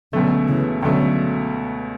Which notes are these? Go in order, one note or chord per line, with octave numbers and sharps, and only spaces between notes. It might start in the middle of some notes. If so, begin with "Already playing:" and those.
C#2 B2 D3 F#3 A3
C#3 E3
C#2 B2 D3 F#3 A3